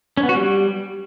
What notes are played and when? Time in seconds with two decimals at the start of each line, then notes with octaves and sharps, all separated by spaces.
0.17 C#4
0.23 B3
0.29 F#4
0.35 G3